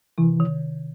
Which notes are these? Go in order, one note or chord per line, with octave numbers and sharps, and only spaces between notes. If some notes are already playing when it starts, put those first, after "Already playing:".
C3 E3
D#3